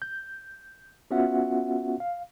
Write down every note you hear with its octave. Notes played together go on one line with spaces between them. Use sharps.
G6
B3 C#4 F4 F#4 E5 F#5
F5